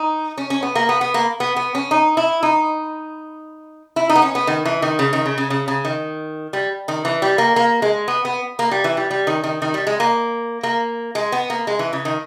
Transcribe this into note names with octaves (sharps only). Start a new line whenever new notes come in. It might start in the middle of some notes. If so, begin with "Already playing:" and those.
Already playing: D#4
C#4
C#4
B3
A#3
B3
B3
A#3
B3
B3
C#4
D#4
E4
D#4
E4
D#4
B3
C#4
B3
D#3
E3
D#3
C#3
D#3
C#3
C#3
C#3
C#3
D#3
G3
D#3
E3
G3
A#3
A#3
G#3
B3
B3
A#3
G3
E3
G3
G3
D#3
D#3
D#3
G3
G#3
A#3
A#3
G#3
B3
A#3
G#3
E3
C#3
D#3